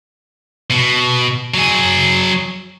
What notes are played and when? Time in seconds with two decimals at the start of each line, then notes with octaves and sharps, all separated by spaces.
0.71 B2
1.54 F#3 G#4